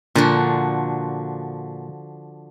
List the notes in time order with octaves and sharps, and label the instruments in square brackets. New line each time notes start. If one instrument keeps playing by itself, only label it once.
[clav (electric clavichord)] A#2 [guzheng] D3 F3 F#4